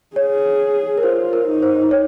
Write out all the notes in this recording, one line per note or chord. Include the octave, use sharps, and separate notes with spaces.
G#4 C#5
A#4
F4 C5
A#4
D#4
C5
C#5